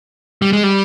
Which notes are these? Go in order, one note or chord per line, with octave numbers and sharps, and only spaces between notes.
G3
G#3
G3